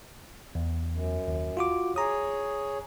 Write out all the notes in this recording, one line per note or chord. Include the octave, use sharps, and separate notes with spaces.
E2
F#2
D#2
F4 F#4 D6
G#4 C#5 A#5 D#6